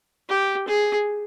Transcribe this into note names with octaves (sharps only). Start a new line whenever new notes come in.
G4
G#4